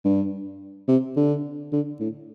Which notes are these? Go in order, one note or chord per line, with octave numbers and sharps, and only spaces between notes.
G2
C3
D3
D3
A2